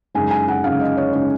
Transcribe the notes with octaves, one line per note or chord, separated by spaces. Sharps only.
F#2 C#3 G#3 D#4 G#5
G#5
F#5
F#2 C#3 G#3 D#4 F5
D#5
C#5
C#3 G#3 D#4 C#5